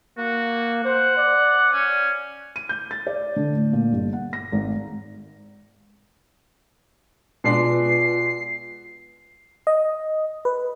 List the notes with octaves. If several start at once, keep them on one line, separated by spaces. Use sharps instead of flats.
A#3 F#4
C5 F#5
D5
C#4
D#7
G6
A6
D5
D3
A2
A#2
G1
F#5
A#6
G#1
B2 G#3 D4 F4 B4 C7
D#5
B4